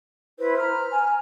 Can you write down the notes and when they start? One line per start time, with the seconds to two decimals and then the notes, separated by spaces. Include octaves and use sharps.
0.38 E4 B4 C5
0.57 A#5 F6
0.91 G#5